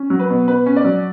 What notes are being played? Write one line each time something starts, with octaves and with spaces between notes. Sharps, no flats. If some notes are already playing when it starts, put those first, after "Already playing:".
Already playing: C#4
F#3
B4
B2
B2 B4
C#4
D5
F#3